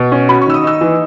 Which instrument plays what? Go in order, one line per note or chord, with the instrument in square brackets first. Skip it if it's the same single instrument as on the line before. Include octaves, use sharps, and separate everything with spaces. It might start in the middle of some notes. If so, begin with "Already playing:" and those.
Already playing: [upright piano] B2
C#4
[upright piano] F#4 [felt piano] B5
[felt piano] C#6
[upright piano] D#3 [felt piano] E6
[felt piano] D#6
[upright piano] D#4 [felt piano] E6
[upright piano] E3